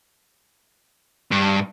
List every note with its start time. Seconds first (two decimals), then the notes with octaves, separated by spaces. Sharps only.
1.31 G2